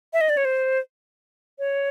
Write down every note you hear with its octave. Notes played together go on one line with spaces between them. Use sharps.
E5
D#5
D5
C#5
C5
C#5